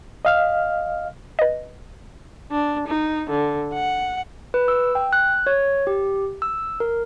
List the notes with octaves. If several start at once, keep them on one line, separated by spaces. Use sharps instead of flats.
D#5 F5 F6
B4 D#5
D4
D#4
D3
F#5
B4
E6
G5
F#6
C#5
G4
E6
A#4